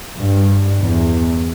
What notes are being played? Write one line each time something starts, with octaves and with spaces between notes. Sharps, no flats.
G2
E2